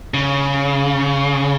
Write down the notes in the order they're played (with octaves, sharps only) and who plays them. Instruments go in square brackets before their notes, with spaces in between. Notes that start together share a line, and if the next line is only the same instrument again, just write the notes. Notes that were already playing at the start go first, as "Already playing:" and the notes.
[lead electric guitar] C#3